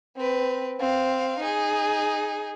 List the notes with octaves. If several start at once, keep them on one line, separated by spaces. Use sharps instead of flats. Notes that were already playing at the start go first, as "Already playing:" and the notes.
C4 B4
C4 F5
D#4 G#4